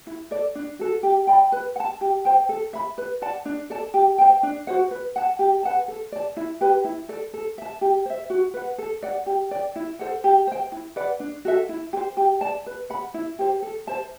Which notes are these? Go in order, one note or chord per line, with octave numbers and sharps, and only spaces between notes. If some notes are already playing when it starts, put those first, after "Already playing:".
E4
A4 D5
D4
F#4 A4
G4
D5 G5 B5
B4
F#5
A5
G4
C5 G5
A4
E5 B5
B4
D5 F#5 A5
D4
A4 D5 A5
G4
C5 E5 G5
D4
F#4 C5 F#5
B4
F#5 A5
G4
B4 F#5 A5
A4
D5 A5
E4
G4 B4
E4
A4 D5
A4
E5 A5
G4
C5 E5
F#4
B4 F#5
A4
D5 F#5
G4
D5 G5
E4
A4 C5 F#5
G4
C5 G5
E4
B4 D5 F#5
D4
F#4 A4 E5
E4
G4
C5
G4
D5 A5
B4
F#5 B5
E4
G4 C5
A4
C5 E5 A5